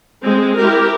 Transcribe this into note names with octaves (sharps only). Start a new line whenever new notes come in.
G#3 C4
E4 G4 A#4